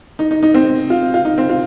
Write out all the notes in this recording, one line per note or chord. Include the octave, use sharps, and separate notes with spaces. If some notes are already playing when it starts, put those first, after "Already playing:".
D#4
D#4
D#4
C4
F4
F4
D#4
C4
F4